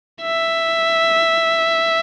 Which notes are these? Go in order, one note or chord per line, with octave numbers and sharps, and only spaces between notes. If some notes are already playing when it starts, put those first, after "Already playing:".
E5